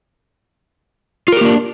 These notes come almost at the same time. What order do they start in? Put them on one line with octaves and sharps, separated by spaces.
F4 A#4 G4 A#3 D4